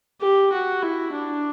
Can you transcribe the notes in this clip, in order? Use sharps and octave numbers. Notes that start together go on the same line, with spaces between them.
G4
F#4
E4
D4